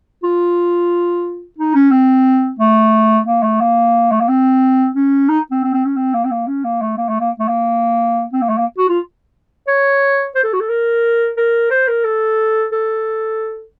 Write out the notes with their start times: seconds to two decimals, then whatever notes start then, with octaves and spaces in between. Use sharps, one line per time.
0.23 F4
1.58 D#4
1.75 C#4
1.91 C4
2.59 A3
3.27 A#3
3.43 A3
3.61 A#3
4.12 A3
4.20 A#3
4.28 C4
4.95 C#4
5.29 D#4
5.51 C4
5.63 C4
5.74 C4
5.85 C#4
5.96 C4
6.14 A#3
6.24 C4
6.31 A#3
6.47 C#4
6.64 A#3
6.82 A3
6.98 A#3
7.09 A3
7.20 A#3
7.39 A3
7.48 A#3
8.33 C4
8.42 A#3
8.49 A3
8.58 A#3
8.78 F#4
8.89 F4
9.68 C#5
10.35 C5
10.43 A4
10.53 F#4
10.60 A4
10.69 A#4
11.37 A#4
11.70 C5
11.88 A#4
12.05 A4
12.72 A4